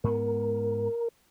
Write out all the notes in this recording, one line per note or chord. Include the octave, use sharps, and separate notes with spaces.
G#2 B3 A#4